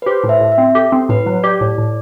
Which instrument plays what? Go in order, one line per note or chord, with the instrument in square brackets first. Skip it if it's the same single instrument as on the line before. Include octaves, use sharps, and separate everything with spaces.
[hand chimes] B4
[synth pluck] G4 [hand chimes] C5
[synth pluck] A2
[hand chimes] E5
[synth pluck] A2
[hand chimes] E5
[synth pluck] C4
[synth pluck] G4 [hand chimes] A4
[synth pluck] C4
[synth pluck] A2 [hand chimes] B4
[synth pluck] F#3
[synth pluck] G4 [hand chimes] D5
[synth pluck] A2
A2